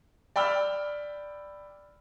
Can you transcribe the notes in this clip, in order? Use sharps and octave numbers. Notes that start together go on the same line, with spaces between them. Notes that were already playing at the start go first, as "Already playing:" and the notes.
D5 G5 B5 E6 F6